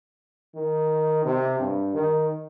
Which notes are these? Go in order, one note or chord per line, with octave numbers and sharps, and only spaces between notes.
D#3
C3
G2
D#3